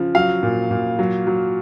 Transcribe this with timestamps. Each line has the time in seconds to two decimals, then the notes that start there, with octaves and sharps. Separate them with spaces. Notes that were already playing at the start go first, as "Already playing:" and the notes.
Already playing: C#3 F3
0.15 F#3 F5
0.43 A#2
0.71 A#2
0.99 F#3
1.27 F#3